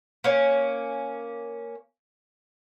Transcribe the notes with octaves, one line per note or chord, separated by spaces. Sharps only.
A#3 C#4